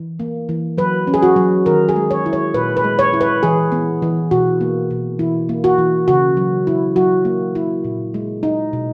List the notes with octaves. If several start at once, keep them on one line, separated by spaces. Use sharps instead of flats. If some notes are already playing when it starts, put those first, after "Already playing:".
Already playing: E3
A#3
E3
F#3 B4
C#4
G#4
F#4
F#3
D#3 A#4
G#4
G#3
C#5
E4
C#5
A#2 B4
B4
G#3
C#5
E4
B4
E3 G#4
B3
E3
B2 F#4
A#3
B2
E3 E4
A#3
F#4
E3
C#3 F#4
F#3
E4
F#3 F#4
A#3
E4
A#2
G#3
D#4
B2